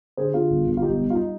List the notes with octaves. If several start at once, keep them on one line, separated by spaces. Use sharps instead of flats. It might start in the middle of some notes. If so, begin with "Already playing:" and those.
D3 G#4 C5
D3 F4 G#4
G1
G1
F4
B1 D#4 G4
G3
F4
D#4